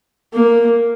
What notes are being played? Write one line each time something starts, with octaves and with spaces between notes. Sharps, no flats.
A#3